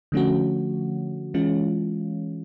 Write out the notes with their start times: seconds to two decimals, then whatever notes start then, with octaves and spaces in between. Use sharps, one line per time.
0.12 D3 F3 A3 C#4 F#4
1.34 E3 G#3 C#4 F4